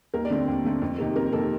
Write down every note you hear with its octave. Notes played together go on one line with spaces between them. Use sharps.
D#2 A#4
D5
D3 A3 C4
D#2
D3 A3 C4
F2
C3 D#3 A#3
F2 A#4
C3 D#3 A#3 A4